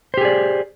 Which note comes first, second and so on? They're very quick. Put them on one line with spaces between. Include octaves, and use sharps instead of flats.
C5 G4 G#4 D5